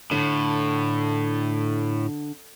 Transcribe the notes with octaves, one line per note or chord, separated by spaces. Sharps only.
A2 D3